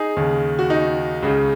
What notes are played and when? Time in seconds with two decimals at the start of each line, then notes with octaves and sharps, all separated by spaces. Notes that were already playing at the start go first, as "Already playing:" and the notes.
Already playing: D#4 G#4
0.16 D#2 C#3
0.59 F#4
0.70 D#4
1.22 C#2 C#3